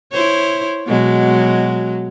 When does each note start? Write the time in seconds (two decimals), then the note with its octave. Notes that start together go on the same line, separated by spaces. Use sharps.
0.12 E4 C5 C#5
0.87 B2 F#3 G#3